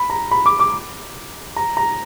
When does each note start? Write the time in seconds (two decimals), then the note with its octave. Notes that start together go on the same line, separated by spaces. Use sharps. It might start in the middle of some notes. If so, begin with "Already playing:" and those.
Already playing: B5
0.10 A#5
0.31 B5
0.46 D6
0.60 D6
1.56 A#5
1.77 A#5